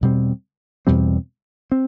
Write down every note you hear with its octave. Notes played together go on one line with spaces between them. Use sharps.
E2 B2 G3 C4
E2 B2 G3 C4
C4